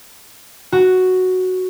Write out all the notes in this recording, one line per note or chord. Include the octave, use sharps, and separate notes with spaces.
F#4